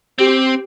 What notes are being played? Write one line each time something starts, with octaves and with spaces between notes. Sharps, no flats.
C4 G4